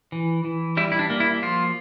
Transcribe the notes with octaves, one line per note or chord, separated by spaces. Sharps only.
E3
E3
G3 E4
E4
D4
A#3
E4
F3 F4